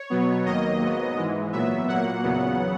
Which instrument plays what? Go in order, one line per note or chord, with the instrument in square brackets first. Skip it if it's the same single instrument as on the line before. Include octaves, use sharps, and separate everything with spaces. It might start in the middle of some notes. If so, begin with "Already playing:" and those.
Already playing: [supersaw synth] C#5
B2 F#3 B3
D#2 D#3 F#3 A#3 D#5
G#2 F#3 B3
G#2 E3 G#3
A#2 F#3 B3 E5
A#2 F#3 A#3 F#5
E2 C#3 F#3 B3